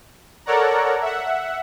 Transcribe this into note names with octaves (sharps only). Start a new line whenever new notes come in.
A4 A#4 C#5 D5 F#5 A#5
E5 F#5